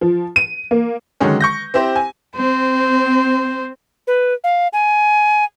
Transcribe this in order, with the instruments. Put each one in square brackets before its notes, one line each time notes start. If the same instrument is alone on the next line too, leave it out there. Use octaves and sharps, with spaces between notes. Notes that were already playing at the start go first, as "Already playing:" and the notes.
[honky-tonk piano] F3
D#7
A#3
[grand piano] D3 D#3 F#3 G#3 C#4
C#6 G6 A#6
C4 E4 G4 C5
G#5
[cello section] C4 [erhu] C5
[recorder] B4
F5
G#5